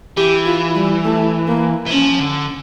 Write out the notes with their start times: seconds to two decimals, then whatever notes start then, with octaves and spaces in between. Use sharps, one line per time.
0.17 E3 G4
0.46 F4
0.75 G3
1.04 A3
1.47 A#3
1.87 E3
1.90 F3 C#4
2.20 D3